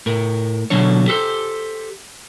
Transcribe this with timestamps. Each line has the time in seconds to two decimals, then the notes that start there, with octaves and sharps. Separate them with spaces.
0.06 A2 A#4
0.70 B2 D3 F#3 D4 C#5
1.08 G4 A4 B4 C5